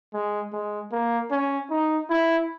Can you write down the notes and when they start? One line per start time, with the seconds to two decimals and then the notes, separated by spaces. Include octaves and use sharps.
0.14 G#3
0.52 G#3
0.92 A#3
1.31 C#4
1.70 D#4
2.10 E4